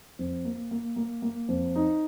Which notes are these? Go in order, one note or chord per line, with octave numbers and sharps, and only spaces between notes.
F2
A#3
A#3
A#3
A#3
F2
D#4